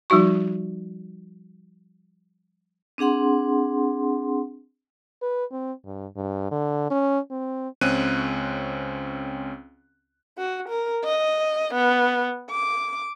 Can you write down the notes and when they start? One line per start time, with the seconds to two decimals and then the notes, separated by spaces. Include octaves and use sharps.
0.10 F3 G3 D#4 F#4 C#6
2.98 C4 D4 G#4 F#5 C6
5.22 B4
5.51 C4
5.85 G2
6.16 G2
6.51 D3
6.91 C#4
7.31 C4
7.81 C#2 C4 C#4 F#6 D#7
10.38 F#4
10.69 A#4
11.04 D#5
11.74 B3
12.51 D6